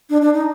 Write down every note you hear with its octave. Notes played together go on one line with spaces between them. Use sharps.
D4
D4
D#4